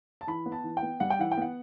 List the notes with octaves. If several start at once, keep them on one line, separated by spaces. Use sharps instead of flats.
A5
E3 B5
B3
A5
E3
G5
B3
G3 F#5
G5
E3 F#5
G5
B3 F#5